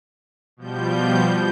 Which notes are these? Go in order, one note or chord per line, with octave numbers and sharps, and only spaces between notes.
B2 F3 G3 G6